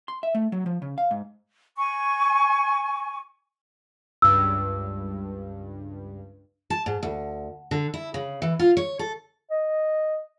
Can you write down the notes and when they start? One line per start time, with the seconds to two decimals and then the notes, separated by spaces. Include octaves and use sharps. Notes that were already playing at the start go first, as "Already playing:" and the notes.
0.08 C6
0.23 E5
0.35 A3
0.52 F#3
0.66 F3
0.82 C#3
0.98 F5
1.11 G#2
1.77 G#5 C#6
4.22 C#2 G2 E6
6.70 A5
6.86 G#2
7.03 D2
7.71 D3
7.94 E4
8.14 C#3
8.42 E3
8.59 F4
8.77 C#5
8.99 A4
9.51 D#5